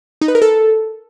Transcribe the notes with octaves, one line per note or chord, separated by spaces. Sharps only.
D#4
B4
A#4
A4